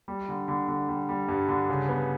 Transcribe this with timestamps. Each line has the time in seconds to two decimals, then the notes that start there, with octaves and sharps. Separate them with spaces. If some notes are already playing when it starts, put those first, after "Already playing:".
0.08 G3
0.28 D3
0.48 D3
0.68 D3
0.88 G3
1.09 G3
1.28 G2
1.48 D3
1.70 C#3
1.89 B3